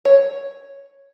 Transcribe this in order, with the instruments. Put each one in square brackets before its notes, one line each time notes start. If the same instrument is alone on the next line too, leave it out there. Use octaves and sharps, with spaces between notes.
[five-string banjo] C#5